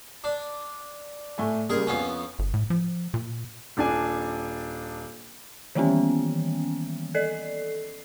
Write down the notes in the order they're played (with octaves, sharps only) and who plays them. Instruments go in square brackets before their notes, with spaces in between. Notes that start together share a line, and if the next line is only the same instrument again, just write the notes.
[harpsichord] D4
[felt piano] A2 A3 G#5
[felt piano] A#2 C#3 G3 [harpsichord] G#4 A#4
[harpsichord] F2 B3 C#4 [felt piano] G#5 C7
[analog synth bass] G1
A2
F3
A#2
[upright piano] D#1 D4 G#5
[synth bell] D#3 E3 G3 A#3 B3 C#4
A4 D5 C7